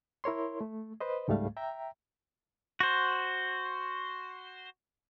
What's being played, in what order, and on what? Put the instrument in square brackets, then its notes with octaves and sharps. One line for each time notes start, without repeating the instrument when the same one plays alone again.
[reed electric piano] E4 A#4 C#5 C6
A3
B4 C5 D#5
C#2 G#2 G3 A3 F5
E5 G5 A#5
[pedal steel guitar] F#4 C5